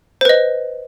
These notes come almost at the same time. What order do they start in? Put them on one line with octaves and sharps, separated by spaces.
C5 B4 D#5